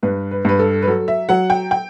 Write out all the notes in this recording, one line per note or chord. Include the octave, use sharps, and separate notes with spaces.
G2 B4
B4
G2 B4
A4
B4
F#3 A4
E5
F#3 F#5
G5
G5